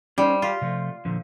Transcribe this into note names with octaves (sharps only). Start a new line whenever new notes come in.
G3 C#4 D#4 C5
F4 G4 F5
C3 F3 A3
A#2 D3 F3